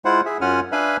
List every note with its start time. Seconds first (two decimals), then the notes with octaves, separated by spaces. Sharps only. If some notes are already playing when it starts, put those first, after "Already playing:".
0.05 G#3 E4 F4 C5 F#5
0.26 G#4 E5
0.41 F#2 C#4 F4 F#5 G#5 F6
0.72 D4 B4 E5 F5 G#5 B5